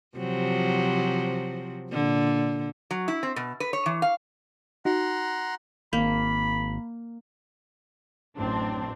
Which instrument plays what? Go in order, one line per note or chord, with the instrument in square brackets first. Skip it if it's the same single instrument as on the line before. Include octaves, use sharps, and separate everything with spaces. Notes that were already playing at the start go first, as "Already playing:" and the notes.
[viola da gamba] C3 F3 F#3
A#2 D3
[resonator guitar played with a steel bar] F#3
E4
C4
B2
B4
C#5
E3
F5
[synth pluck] D#4 F#4 [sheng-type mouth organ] F#5 A#5 C6
[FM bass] G#1 [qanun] A#3 [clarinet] B5
[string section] A1 F#2 C4 D4